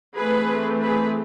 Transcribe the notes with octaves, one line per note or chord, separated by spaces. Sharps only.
E3 A3 C4 G#4 B4
G#4 B4